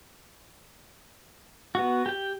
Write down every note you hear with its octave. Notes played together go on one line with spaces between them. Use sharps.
B3 F#4
G4 G5